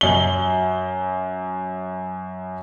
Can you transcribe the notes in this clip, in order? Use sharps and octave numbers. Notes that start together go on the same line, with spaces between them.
F#2 G7